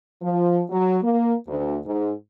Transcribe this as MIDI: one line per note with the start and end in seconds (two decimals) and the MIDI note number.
0.22 0.62 53
0.70 0.96 54
1.03 1.34 58
1.47 1.76 38
1.86 2.11 44